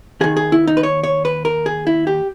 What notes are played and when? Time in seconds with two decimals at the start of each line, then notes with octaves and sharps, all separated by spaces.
0.21 D#2 D#3 G#4
0.37 G#4
0.52 E4
0.67 D#4
0.77 B4
0.83 C#5
1.03 C#5
1.25 B4
1.45 A#4
1.66 G#4
1.87 E4
2.07 G4